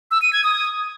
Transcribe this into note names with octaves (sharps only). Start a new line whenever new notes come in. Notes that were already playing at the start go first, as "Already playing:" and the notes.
E6
D#7
G#6
D#6